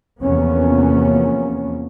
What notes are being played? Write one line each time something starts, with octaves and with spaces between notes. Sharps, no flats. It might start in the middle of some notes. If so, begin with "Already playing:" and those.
E2 C3 F3 A#3 B3 C#4